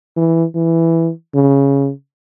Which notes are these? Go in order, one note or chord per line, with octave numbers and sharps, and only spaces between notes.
E3
E3
C#3